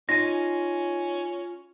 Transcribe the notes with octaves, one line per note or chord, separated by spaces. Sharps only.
C#4 D#4 F4 G#5 A#6